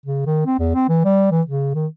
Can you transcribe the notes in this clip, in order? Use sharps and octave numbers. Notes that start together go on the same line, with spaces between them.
C#3
D#3
C4
E2
C4
E3
G3
E3
C#3
D#3